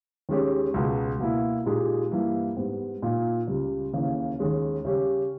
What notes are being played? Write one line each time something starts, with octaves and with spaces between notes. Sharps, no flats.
D#2 D#3 G#3 C#4 G4
C#2 B2 G#3
B2 A#3 E4
A#2 G#3 D#4 G4
G2 E3 G3 A#3
G#2 G3 B3
A#2 A#3 D#4
C#2 C#3 G3
D#2 C#3 E3 A#3
D#2 D#3 G#3 C#4
C#3 G3 C#4 G4